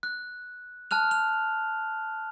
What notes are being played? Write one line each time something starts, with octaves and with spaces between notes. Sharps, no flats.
F#6
A5 F6 F#6 F7
F7